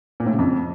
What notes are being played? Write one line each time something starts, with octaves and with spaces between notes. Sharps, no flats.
A#2
A2
C#3
F2